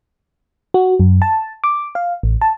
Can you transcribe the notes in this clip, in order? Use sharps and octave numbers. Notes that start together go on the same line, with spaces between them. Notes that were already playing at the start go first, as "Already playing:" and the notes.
F#4
F#2
A5
D6
F5
A1
A5